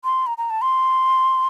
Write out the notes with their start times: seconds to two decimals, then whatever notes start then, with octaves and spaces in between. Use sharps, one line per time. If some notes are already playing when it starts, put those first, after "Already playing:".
0.04 C6
0.27 A#5
0.38 A#5
0.50 A5
0.62 C6